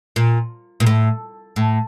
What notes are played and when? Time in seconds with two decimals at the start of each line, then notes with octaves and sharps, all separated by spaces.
0.16 A#2
0.80 A#2
0.86 A2
1.56 A2